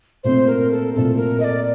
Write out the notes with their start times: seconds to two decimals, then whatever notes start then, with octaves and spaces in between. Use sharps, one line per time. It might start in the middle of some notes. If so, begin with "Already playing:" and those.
0.23 A#2 A3 C4 C5
0.47 A#4
0.71 A4
0.94 A#2 A3 C4 A4
1.17 A#4
1.40 D#5
1.44 D5